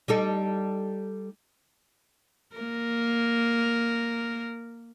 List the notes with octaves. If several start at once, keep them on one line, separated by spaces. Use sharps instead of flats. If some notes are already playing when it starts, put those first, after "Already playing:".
G3 D#4 A4
A#3 A#4